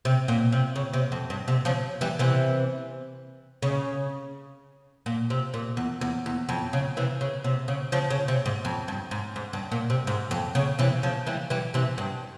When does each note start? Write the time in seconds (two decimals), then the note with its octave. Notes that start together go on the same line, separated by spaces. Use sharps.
0.05 C3
0.28 A#2
0.52 C3
0.76 C#3
0.93 C3
1.12 F2
1.30 G2
1.48 C3
1.65 C#3 F3
2.01 E3 G3
2.19 C3 E3
3.62 C#3
5.06 A#2
5.30 C3
5.54 A#2
5.77 E2
6.01 E2
6.26 E2
6.49 F2
6.73 C#3
6.97 C3 E3
7.21 C#3
7.44 C3
7.68 C#3
7.92 C#3 F3
8.10 C#3
8.28 C3
8.46 G#2
8.65 F2
8.88 G2
9.11 G#2
9.36 G#2
9.53 G2
9.72 A#2
9.90 C3
10.07 G#2
10.31 F2
10.55 C#3
10.79 C3 E3
11.03 C#3 F3
11.27 E3 G3
11.50 E3 G3
11.74 C3 E3
11.98 G2